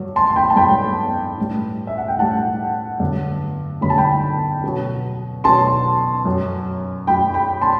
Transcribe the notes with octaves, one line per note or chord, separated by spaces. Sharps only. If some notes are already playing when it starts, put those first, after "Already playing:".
Already playing: G2 F#3
A5 C6
G5 B5
A5
G2 F#3 G5 B5
A2 G3
E5
F#5
G5
A2 G3 F#5 A5
G2 D3 F#3
G2 D3 F#3 B5
A5
G5 B5
B2 F#3
B2 F#3 A5 C6
F#2 F#3
F#2 F#3 G5 B5
G5 B5
A5 C6